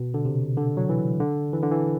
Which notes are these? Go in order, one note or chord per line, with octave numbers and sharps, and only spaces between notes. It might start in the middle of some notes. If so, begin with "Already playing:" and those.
Already playing: B2
D3
C3
D3
F#3
E3
D3
E3
D3
E3